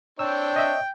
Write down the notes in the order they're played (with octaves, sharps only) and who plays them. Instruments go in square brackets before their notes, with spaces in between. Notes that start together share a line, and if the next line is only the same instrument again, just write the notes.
[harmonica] C4 C#5 [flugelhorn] D4 [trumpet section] G5 [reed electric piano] E6
[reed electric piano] D#5 E5